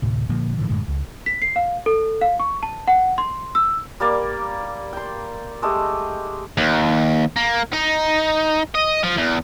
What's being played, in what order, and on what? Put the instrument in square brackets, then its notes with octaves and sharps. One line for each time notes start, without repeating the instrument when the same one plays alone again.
[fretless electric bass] D2 A2 C3
A#2 D3 F3 A#3
A2 D3 E3 F3
F#2 A2 D3 G#3
C#2
[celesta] B6
C7
F5
A4
F5
C#6
A5
F#5
C6
E6
[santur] G3 A#3 D5
G5 C6
G#3 A3 G4 D#5
[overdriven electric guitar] D#2
A#3
D#4
D#5
F3
E2